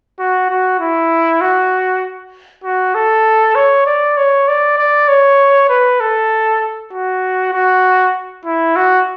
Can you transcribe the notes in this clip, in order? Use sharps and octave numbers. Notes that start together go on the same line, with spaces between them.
F#4
F#4
E4
F#4
F#4
A4
C#5
D5
C#5
D5
D5
C#5
B4
A4
F#4
F#4
E4
F#4